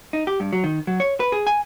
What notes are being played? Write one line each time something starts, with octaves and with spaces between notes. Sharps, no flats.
D#4
G4
G2
F#3
D#3
F#3
C#5
B4
G#4
G#5